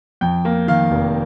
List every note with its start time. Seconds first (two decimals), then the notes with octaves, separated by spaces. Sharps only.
0.21 F2 G5
0.45 A#3
0.68 D#3 F5
0.91 F1